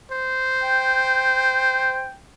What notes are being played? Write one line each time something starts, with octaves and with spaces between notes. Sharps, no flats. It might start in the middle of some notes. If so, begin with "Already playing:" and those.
C5
G5